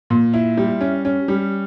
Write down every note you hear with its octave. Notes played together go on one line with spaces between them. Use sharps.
A#2
E4
G3
C#4
C#4
G3